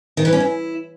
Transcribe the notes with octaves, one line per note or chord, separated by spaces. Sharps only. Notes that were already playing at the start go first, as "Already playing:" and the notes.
D#3
E3
C#4
E4